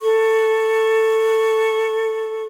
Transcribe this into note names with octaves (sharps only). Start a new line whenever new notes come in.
A4 C#6